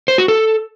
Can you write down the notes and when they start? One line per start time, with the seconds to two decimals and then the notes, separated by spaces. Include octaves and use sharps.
0.08 C5
0.18 F#4
0.28 A4